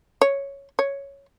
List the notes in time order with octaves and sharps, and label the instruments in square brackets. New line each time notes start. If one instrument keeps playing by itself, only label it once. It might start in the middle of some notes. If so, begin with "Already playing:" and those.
[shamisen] C#5
C#5